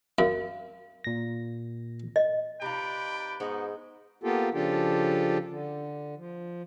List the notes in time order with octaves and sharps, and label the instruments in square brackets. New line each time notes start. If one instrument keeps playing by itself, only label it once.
[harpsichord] F#2 [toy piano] F5
[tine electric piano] A#2 A#6
[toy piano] D#5
[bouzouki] C3 D#4 F4 [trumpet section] B4 D5 G5 [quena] B5
[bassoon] G#2 [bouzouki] B3 D#4 F#4
[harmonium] A#3 B3 F4 G4 A4
C#3 F3 D4 F4 G4 A4
D3
F3